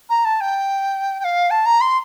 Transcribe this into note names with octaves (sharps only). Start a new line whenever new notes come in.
A#5
A5
G5
G5
F5
A5
A#5
C6